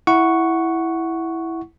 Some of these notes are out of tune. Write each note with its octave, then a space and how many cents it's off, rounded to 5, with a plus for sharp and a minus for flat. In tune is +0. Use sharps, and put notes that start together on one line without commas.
E4 +0 F#5 +0 C#6 +0